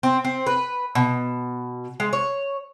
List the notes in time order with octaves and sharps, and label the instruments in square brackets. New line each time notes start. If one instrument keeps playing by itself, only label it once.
[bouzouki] C4
C4
B4
B2
G#3
C#5